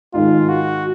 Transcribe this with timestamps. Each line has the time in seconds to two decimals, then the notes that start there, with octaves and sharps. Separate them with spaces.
0.13 G#2 D#3 G#3 F4
0.49 F#4